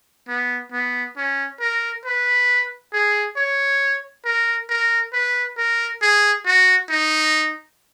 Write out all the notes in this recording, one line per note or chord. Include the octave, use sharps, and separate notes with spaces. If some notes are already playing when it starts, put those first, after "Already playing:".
B3
B3
C#4
A#4
B4
G#4
C#5
A#4
A#4
B4
A#4
G#4
F#4
D#4